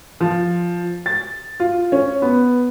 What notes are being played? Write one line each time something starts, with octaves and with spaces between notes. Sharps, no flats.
F3
A6
F4
C#4
B3